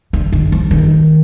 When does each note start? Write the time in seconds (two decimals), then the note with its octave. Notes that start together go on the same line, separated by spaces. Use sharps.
0.13 D3
0.32 D#3
0.52 F3
0.71 D#3